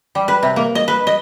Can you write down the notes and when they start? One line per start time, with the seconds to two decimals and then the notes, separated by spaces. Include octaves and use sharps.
0.15 G3
0.28 B4
0.43 C3
0.56 A#3
0.75 D#5
0.88 B4
1.07 D#5